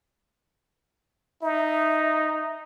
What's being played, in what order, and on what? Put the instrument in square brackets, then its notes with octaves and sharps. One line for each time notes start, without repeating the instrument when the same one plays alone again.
[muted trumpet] D#4 [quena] E5